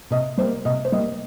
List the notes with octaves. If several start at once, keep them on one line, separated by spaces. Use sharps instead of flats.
C3 D#5
G3 A#3 C5
C3 D#5
C5
G3 A#3 D#5